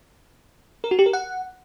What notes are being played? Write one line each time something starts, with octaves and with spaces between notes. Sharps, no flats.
A#4
F#4
G4
A#4
F#5